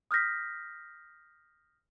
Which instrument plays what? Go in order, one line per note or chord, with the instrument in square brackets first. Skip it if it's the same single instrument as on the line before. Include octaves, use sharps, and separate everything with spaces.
[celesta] D#6 F6 G6 A#6 B6